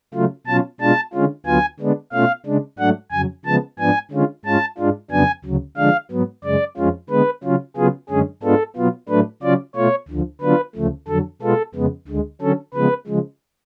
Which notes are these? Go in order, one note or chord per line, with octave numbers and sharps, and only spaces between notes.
C#3 F#3 A3 F4
B2 F#3 C#4 F4 A5
B2 G#3 D4 F4 A5
D3 G#3 C#4 F4
D2 D3 F#3 B3 F4 G#5
D3 G#3 B3 D4
B2 A3 C#4 F4 F5
C#3 G#3 D4
G#2 F#3 A3 D4 F#5
F2 C#3 F#3 G#5
C#3 F3 G#3 B3 A5
G#2 F3 B3 D4 G#5
D3 G#3 C#4 F4
G#2 G#3 C#4 F4 A5
G#2 G#3 D4 F4
F2 C#3 F#3 B3 D4 G#5
D2 C#3 F#3
D3 F3 G#3 D4 F5
G#2 F#3 B3
F#2 C#3 G#3 D5
F2 F3 G#3 C#4 F4
D3 G#3 B3 B4
C#3 F#3 C#4 F4
C#3 F#3 B3 F4 G#4
F#2 D3 G#3 C#4 G#4
G#2 G#3 B3 D4 F4 A4
B2 F#3 B3 F4
A2 F#3 A3 D4 B4
C#3 F#3 C#4 F4 D5
B2 A3 F4 C#5
D2 D3 F3
D3 F#3 B3 D4 F4 B4
D2 C#3 F3 A3
F2 D3 F#3 A4
B2 G#3 B3 F4 A4
F2 C#3 G#3 B3
D2 D3 G#3
D3 F#3 C#4 A4
C#3 F3 G#3 B3 B4
C#3 F3 G#3